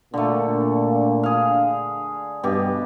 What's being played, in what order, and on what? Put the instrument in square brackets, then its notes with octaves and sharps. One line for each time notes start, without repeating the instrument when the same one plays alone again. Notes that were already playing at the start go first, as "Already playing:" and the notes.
[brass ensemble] A#2 D4 [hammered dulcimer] D3 A3
[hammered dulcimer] G#4 F5
[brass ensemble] G2 [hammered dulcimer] B2 G4